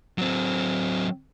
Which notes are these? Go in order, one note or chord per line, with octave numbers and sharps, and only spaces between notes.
F#3 C4